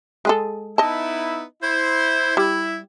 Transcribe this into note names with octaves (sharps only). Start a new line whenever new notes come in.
G#3 G#4 A4
B3 D#4 E4 D#5 A5
E4 C5
G3 E4